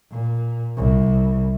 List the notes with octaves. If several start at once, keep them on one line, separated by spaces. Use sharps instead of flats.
A#2
C2